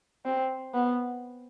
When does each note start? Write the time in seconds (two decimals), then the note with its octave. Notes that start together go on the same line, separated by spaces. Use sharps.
0.25 C4
0.74 B3